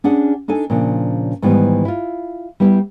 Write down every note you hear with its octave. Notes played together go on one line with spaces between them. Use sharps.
C#4 D4 G#4 F#5
D4 D#4 A4 G#5
A#2 C#3 F3 D4
G#2 D#3 E3 G3 B3
E4 F4
G3 B3 E4 G4